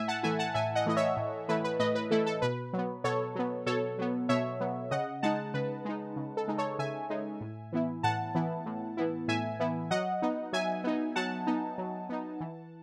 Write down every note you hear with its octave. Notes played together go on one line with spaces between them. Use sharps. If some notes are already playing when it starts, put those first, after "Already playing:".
Already playing: A2 E5 G#5
F#5 A5
E3 A3 E4 E5 G#5
F#5 A5
A2 E5 G#5
D#5 F#5
E3 A3 E4 D#5
C#5 E5
A2
E3 A3 E4 B4
B4
A2 B4 D#5
B4
E3 A3 E4 A4
A4
B2 B4
F#3 B3
B2 A4 C#5
F#3 B3
B2 A4 C#5
F#3 B3
B2 C#5 E5
F#3 B3
C#3 D#5 F#5
G#3 D#4 F#5 A5
C#3 B4
G#3 D#4
C#3
A4
G#3 D#4
A4 C#5
C#3 E5 G#5
G#3 D#4
A2
E3 B3 E4
A2 F#5 A5
E3 B3 E4
A2
E3 B3 E4
A2 E5 G#5
E3 B3 E4
F#3 D#5 F#5
B3 D#4
F#3 E5 G#5
B3 D#4
F#3 F#5 A5
B3 D#4
F#3
B3 D#4
E3